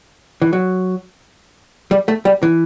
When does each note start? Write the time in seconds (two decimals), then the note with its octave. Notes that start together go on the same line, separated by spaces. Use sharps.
0.42 E3
0.53 F#3
1.91 G3
2.08 A3
2.25 G3
2.43 E3